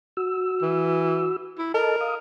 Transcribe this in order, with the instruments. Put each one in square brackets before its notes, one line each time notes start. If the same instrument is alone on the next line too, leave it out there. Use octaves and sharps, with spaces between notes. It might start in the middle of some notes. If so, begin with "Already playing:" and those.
[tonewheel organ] F#4 E6
[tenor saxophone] E3
E4
[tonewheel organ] A4 D#5 A5 [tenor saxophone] A#4
[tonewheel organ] F5 D#6